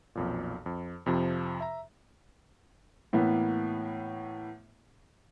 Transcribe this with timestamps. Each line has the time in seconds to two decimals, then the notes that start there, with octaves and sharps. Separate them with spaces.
0.15 B1 F2 A#2
0.66 F2
1.06 F2 C3 F3
1.61 E5 A#5
3.13 A2 E3 A#3 B3